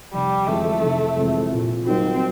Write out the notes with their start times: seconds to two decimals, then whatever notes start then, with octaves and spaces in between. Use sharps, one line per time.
0.13 F1 G3
0.47 F2 C3 E3 G#3 A3
0.82 F1
1.17 F2 C3 E3 G#3
1.52 A#2
1.86 F#3 A#3 C4 D#4 F#4